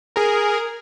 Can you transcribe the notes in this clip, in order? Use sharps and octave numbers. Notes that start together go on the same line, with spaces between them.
G#4 A#4